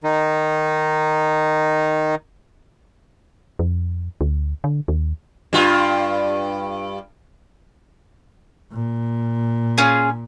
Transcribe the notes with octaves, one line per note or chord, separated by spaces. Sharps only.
D#3 D#4
F2
D2
D3
D#2
G2 F4
A#2
C#4 F4 G#4